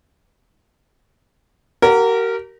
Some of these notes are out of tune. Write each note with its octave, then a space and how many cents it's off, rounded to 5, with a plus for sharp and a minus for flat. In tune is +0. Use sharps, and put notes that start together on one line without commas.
G4 -40 A#4 -15 F#5 -25